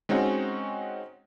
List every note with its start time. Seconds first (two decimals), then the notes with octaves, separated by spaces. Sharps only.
0.09 G#3 C4 C#4 D#4 F#4